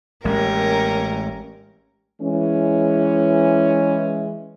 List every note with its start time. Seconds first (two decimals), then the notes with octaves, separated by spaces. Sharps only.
0.25 A1 G#3 A#3 C#4 G4 A#4
2.21 E3 G#3 C#4